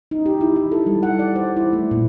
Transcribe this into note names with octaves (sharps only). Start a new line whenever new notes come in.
D#4
G4
E4
E4
A4
G3
F#5
D5
C5
E4
A3
A#2